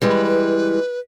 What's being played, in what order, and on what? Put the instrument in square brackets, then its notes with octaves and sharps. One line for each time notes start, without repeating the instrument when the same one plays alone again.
[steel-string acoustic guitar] E3 G3 G#3 [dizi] B4